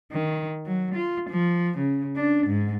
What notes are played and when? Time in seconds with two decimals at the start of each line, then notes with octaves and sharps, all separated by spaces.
0.12 D#3
0.66 F#3
0.95 F4
1.29 F3
1.78 C#3
2.16 D4
2.47 G#2